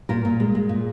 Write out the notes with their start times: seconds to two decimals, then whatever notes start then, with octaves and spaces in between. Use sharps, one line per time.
0.09 A#2 A#4
0.25 A#2
0.40 G#3
0.55 G#3
0.69 A#2